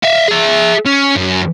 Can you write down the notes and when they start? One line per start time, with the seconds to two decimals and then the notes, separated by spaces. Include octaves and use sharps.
0.03 E5 F5
0.28 G#4 E5
0.86 C#4
1.16 F#2